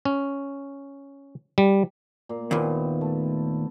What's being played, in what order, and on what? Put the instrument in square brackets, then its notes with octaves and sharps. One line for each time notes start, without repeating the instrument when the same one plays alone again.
[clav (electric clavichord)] C#4
G3
[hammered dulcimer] A#2
[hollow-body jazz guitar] D#2 A#2 [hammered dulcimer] B3 C4 E4
[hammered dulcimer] A3